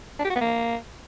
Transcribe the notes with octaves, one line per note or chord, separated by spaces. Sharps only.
D4
G4
F#4
B3
A#3